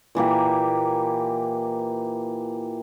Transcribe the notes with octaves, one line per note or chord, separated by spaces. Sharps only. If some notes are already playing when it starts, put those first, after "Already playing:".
A#2 E3 A#3 G4